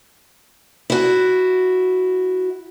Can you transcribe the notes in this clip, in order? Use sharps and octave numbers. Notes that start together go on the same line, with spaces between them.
E4 F#4